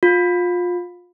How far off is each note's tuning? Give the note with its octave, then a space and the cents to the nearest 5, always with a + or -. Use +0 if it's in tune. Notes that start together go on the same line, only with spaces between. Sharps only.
F4 +25